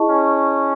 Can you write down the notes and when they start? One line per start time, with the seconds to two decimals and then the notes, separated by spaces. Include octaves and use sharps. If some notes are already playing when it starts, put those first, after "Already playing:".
Already playing: E4 G#4 D#5 A5 C#6
0.09 C#4